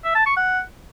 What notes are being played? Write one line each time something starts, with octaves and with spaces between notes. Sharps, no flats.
E5
A5
C#6
F#5